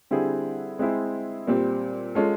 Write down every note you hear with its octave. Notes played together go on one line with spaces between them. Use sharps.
D3 G3 C4 E4 G#4
G#3 C4 E4 G#4
A#2 G3 C4
G#3 C#4 F4 A4